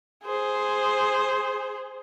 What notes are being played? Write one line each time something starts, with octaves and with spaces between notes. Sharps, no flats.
G#4 C5